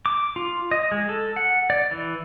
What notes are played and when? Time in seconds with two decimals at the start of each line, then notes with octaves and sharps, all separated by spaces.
0.06 D6
0.36 F4
0.71 D#5
0.92 G#3
1.09 A4
1.36 F#5
1.70 D5
1.91 E3